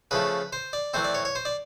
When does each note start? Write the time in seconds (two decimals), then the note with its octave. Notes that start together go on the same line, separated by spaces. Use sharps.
0.11 C#3 F3 A3 B4
0.53 C5
0.73 D5
0.94 E3 A3 C4 C5
1.04 D5
1.14 C#5
1.25 C#5
1.35 C5
1.45 D5